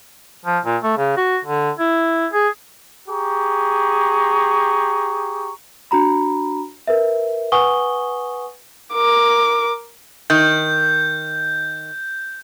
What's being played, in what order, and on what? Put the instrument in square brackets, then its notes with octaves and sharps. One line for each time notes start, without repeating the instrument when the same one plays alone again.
[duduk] F3
A#2
A3
C#3
F#4
D3
E4
G#4
[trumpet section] G4 G#4 A#5 C#6
[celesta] D4 F#4 A#5 B5
A#4 B4 E5
B4 F#5 G#5 C#6 D#6 G7
[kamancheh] A#4 D6
[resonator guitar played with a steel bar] D#3 [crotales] G6